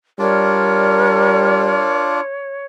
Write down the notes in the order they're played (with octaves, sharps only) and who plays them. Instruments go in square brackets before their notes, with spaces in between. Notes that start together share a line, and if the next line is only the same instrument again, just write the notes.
[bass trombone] G3 [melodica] D4 F4 D5 [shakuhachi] A#4 [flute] C#5